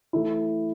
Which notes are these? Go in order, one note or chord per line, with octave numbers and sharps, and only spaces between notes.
E3 A3 E4